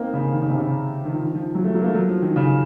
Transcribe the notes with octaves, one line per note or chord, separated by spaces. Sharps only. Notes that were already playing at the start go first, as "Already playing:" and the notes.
Already playing: A#3 C4 D#4
C#3
D#3
C#3
C3
C#3
D#3
F3
D#3
F3
F#3
A3
F#3
A#3
A3
F#3
F3
D#3
C#3